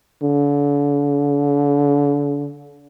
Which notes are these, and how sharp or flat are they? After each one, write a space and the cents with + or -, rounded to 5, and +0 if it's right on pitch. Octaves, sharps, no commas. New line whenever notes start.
D3 -40